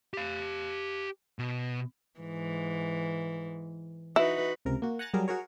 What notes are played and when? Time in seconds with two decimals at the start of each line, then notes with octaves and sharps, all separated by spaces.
0.14 G4 F5
1.39 B2
2.20 G#2 E3
4.16 D#4 E4 F#4 B4
4.65 C#2 C3 A#4
4.82 A#3 F#4
4.99 F#5 G#5 A#5 F#6 A6
5.14 F#3 G3 G#4 A#4
5.28 F#4 G#4 A#4 C#5